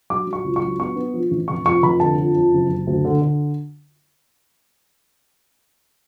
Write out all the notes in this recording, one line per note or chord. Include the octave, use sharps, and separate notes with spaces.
F#3 D6
F#3
C#6
C#2
C#6
F#3
B3 C#6
B3
F3
A1
F1 C#6
F2 C#6
F1 B5
D3 A5
F2
F2
F#1
F#1
D2
D3
D3